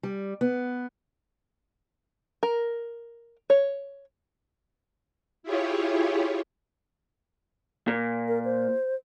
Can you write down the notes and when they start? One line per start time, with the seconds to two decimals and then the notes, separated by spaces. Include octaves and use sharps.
0.03 G3
0.41 B3
2.43 A#4
3.50 C#5
5.43 E4 F4 G4 G#4 C#5
7.88 A#2
8.28 A#4
8.45 C5